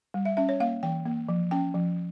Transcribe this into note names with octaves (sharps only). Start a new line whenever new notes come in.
G3
E5
C#4 E5
C#5
A#3 F5
E3 G5
A#3
F3
C#4 G5
F3